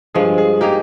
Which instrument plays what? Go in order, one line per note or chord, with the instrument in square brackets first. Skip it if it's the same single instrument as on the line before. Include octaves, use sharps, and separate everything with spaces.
[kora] G2 F3 G#3 [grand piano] G#4
[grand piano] G#4
[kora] A#3 D#4 G#4 [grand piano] G4